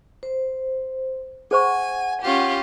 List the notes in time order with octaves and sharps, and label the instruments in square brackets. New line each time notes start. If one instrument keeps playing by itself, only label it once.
[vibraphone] C5
[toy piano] G#4 C5 C#6 [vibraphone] F#5 [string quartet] G#5
[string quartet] C#4 F4 G4